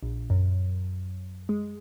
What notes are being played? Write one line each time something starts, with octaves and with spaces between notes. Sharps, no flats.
A#1
F#2
G#3